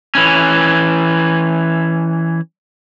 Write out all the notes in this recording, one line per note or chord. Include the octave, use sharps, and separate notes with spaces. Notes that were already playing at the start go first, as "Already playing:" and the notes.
E3 C#4